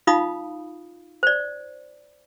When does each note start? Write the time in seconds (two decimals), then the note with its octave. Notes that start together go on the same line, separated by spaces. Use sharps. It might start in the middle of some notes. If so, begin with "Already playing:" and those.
0.07 D#4 F4 F5 B5 D#6
1.23 C5 D5